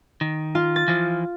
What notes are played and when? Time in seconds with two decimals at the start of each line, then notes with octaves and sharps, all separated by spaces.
0.21 D#3
0.55 F4
0.76 A6
0.88 E3 F3